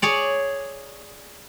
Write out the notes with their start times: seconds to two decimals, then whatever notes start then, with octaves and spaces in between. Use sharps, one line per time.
0.02 G#4 C#5 D5